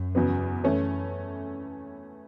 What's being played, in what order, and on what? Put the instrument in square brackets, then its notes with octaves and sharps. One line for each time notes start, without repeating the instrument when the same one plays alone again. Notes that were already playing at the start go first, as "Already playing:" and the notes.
Already playing: [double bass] F#2
[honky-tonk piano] E2 C#3 F#3 B3
[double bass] F#2 [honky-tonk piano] E3 A3 C#4